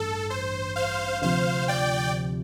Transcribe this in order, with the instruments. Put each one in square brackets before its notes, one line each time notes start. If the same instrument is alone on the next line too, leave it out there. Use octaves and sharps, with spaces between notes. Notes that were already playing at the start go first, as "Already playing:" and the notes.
Already playing: [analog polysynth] A1 G2 [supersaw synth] A4
[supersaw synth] C5
C5 F5
[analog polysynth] D2 C3 F3 [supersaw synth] C5 F5
[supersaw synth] D5 G5